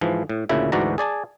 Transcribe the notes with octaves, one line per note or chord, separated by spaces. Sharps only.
G#2 E3 F3
A2
D2 A#2 C#3 E4 E5
D2 G#2 E3 F#4 D5 A#5
G#4 D5 G#5 A5